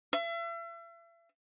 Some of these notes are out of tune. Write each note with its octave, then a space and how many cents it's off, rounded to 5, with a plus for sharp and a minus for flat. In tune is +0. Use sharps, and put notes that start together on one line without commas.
E5 +40